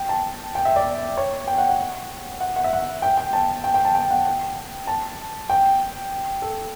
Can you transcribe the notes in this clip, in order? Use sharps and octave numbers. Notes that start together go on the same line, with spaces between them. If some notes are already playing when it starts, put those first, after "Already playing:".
Already playing: G5
A5
G5
E5
D5
C#5
G5
F#5
F#5
F#5
F#5
E5
F#5
G5
G5
A5
G5
G5
A5
G5
F#5
G5
A5
G5
A4